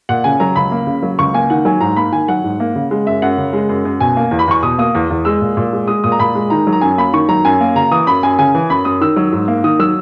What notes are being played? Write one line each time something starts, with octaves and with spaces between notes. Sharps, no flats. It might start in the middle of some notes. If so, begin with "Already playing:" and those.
A#2 F#5
C#3 G#5
F#3 A#5
C#2 B5
A#3
C#3
F#3
C#2 C#6
A#3 G#5
D#3 F#5
F#3 G#5
G#2 A#5
A#3 B5
D#3 G#5
F#3 F#5
G#2
A#3
C#3
G#3
F#2 E5
F#2 F#5
C#3
G#3
F#2
F#2
B2 G#5
A#3
E2
B5
E2 C#6
B2 D#6
A#3 D#6
E2
E2
G#3 E6
A#2
A#2
G#3
G#3 D#6
A#2 D#6
A#5
A#2 B5
G#3
D#3 A#5
F#3
A#5
F#2 G#5
A#3 B5
D#3 C#6
F#3 A#5
F#2 G#5
A#3
C#3 A#5
E3 D#6
F#2 B5
F#2 G#5
C#3 G#5
E3
F#2 B5
F#2 D#6
D#3 E6
F#3
G#2
A#3
D#3 D#6
F#3 E6